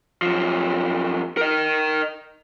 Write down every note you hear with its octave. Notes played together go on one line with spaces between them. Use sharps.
F#2 F3
A#4 D#5